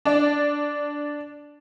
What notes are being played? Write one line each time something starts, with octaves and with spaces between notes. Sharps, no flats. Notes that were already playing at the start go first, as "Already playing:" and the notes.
D4 D5